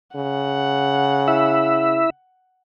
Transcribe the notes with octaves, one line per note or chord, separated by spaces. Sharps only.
C#3 F#5
E4 E5